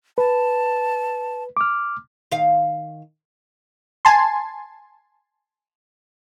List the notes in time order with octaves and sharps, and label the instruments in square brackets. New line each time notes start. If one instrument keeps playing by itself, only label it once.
[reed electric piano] B4 [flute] A5
[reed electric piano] D6 F6
[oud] D#3 F5
[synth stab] G#5 A5 C6